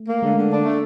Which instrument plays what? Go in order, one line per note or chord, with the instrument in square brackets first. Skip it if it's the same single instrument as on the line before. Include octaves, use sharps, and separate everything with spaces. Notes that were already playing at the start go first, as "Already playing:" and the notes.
Already playing: [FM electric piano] A3
[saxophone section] A#3
[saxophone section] D3 [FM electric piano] G#3
[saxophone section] D3
D4
A3